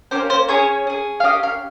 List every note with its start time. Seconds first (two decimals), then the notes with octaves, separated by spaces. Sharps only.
0.11 A#3 C#4 G4 C5
0.30 C5
0.49 C#4 G#4 C#5
0.87 C#4 G#4
1.20 F5
1.24 C#4 G4 D#5
1.43 F5